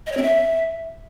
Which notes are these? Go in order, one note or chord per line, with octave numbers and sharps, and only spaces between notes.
D#5
C#5
C4
E5